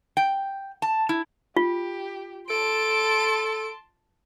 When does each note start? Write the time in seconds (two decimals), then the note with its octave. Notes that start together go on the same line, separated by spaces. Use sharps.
0.17 G5
0.82 A5
1.09 E4
1.57 F4 G4
2.50 A4 A5 C6 D7